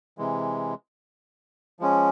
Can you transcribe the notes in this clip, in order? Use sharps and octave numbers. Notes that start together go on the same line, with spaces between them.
C3 E3 G#3
F3 G#3 C#4